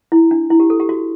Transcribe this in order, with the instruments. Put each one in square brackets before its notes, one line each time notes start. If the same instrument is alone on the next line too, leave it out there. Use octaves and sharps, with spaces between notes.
[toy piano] E4
D4
E4
G4
A4
G4
F#4